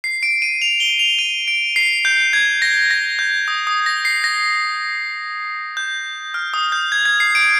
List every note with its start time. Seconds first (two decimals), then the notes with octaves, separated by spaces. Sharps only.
0.04 C7
0.23 D7
0.42 D#7
0.62 F7
0.80 G7
0.99 F7
1.19 D#7
1.48 D7
1.76 C7
2.05 G6
2.33 G#6
2.62 A#6
2.91 A#6
3.19 G6
3.48 D#6
3.67 D#6
3.86 A#6
4.05 C7
4.24 A#6
5.77 G6
6.34 F6
6.54 D#6
6.72 G6
6.92 G#6
7.06 G#6
7.20 C7
7.35 D7